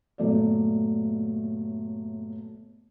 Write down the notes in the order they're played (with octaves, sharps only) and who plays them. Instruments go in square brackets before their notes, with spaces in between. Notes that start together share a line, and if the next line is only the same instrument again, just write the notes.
[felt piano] G1 A#2 F#3 A3 D5